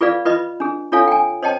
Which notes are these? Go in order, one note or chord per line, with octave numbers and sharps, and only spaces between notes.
F4 G#4 B4 D5 F5
F4 B4 D#5 B5
D4 G#4
D4 F4 A4 C#5 F5 G#5
G5 G#5
C5 C#5 D#5 G5 A5